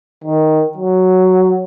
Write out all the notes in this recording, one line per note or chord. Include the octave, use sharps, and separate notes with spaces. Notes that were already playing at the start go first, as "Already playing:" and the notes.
D#3
F#3